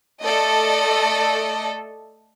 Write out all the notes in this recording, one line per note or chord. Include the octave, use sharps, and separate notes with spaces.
A3 A4 D5 D#5